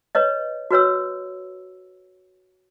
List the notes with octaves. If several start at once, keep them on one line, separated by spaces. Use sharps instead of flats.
B4 C#5 D#5
F#4 B4 C#5 E6